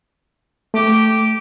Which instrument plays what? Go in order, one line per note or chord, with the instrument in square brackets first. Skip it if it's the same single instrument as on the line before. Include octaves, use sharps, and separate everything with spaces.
[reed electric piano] A3 [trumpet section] G4 D6